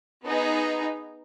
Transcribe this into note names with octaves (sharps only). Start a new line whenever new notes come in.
B3 D#4 G#4